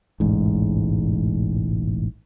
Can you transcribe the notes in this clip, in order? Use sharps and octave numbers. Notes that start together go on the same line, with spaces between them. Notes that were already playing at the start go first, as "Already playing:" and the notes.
E1 A1 G#2